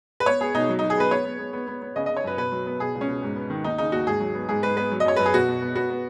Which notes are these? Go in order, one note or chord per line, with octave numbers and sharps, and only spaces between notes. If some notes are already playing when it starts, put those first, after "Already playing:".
B4
B3 C#5
B3 G#4
B2 D#4
F#3
D#4
F#3
G#4
B3 B4
B3 C#5
B3
B3
B3
B3
B3
C#3 D#5
C#3 D#5
C#5
F#2 B4
B2 B4
F#3
B3
B2 G#4
C#2
C#4
B2
G#2
B3
D#3
D#2 D#4
C#3 D#4
D#2 F#4
G#2 G#4
F#3
B3
G#2 G#4
G#2 B4
B3 B4
F#3
D#5
F#2 C#5
F#2 B4
G#4
B2 F#4
B2
B3
B3 F#4
B3